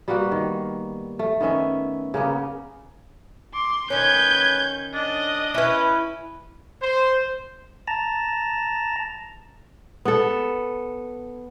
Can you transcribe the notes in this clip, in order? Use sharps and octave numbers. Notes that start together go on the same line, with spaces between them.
G3 A#3 B3 F#4
D#3
A3
D#3 B3 C#4 E5
C#3 A#3 B3
C6 D6
D#3 C#4 B4 G6 G#6
D4 D#5
C#4 E4 B4
C5
A5 A#5
B3 A4